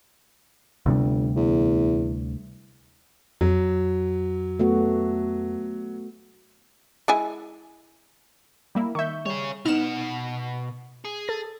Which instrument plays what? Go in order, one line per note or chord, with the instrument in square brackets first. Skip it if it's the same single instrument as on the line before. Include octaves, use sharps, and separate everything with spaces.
[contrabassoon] G1 [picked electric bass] D2 C3 G3
[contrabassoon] E2
[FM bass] F2 [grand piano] F#3
[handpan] A3 B3 F#4
[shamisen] G#3 E4 G#5
[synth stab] G3 A#3 E4
[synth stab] D#3 E5 [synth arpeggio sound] C#6 G6
[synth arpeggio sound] G3 [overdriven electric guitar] G#4 C#5
[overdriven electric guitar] B2 F#5 [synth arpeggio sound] B3 D#4 [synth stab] F6 E7
[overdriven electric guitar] G#4
[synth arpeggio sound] A4 A6